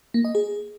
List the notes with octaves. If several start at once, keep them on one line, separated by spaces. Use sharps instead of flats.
A#3
D#5
G#4